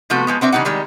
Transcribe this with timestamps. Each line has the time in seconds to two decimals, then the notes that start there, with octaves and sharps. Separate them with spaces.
0.10 C3 F3 A3 B3 F#4
0.27 F3 G#3 B3
0.41 B3 C4 D4 E5
0.52 C#3 E3 G3 D#4 F#5
0.65 D#3 G3 G#3